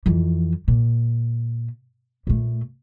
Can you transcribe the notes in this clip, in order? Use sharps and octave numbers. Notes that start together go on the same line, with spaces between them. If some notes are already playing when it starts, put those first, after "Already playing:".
F2 E3
A#2
A#2 A3